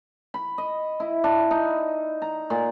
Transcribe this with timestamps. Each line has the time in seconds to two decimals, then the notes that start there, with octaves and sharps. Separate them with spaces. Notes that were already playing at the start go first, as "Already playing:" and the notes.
0.34 B5
0.58 D#5
1.00 E4
1.24 D4
1.51 D#4
2.22 A#5
2.50 A#2